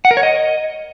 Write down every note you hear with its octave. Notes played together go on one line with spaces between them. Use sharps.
F#5
A#4
C#5
D#5